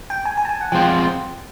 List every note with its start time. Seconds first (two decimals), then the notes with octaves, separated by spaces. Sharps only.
0.10 G5
0.25 G#5
0.37 G#5
0.45 A5
0.49 G#5
0.61 F#5
0.72 F3 G#3 C4 F4 G5